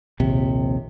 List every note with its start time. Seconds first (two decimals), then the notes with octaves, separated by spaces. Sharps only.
0.20 A#1 D#2 C3